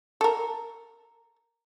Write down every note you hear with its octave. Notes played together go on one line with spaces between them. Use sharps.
A4 A#4